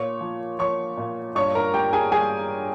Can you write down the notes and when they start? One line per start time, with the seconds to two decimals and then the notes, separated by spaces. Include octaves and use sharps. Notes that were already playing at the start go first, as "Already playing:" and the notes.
Already playing: A#2 C#5 C#6
0.21 F3
0.59 F3 C#5 C#6
0.97 A#2
1.35 G2 C#5 C#6
1.55 A#4 A#5
1.74 G3 G4 G5
1.93 G#4 G#5
2.12 G3 G#4 G#5